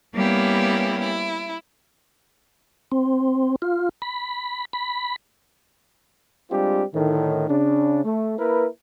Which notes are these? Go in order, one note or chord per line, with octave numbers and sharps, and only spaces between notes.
G3 A#3 B3 C#4 E4 G4
E4
C4
F4
B5
B5
G3 G#3 C4 D4 F4 G4
A2 D3 D#3
C#3 D4
A3
A#3 E4 A#4 B4